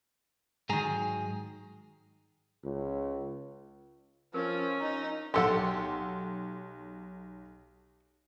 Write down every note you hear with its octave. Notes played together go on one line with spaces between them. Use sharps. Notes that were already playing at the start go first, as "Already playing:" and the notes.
G#2 D#3 F#3 G#4 A#5
C#2
F3 C#4 A#4
D#4 A#5
B1 G4 A4 F#5 C6